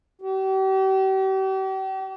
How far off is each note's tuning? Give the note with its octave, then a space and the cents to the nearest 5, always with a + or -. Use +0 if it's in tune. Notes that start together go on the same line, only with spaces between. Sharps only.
G4 -40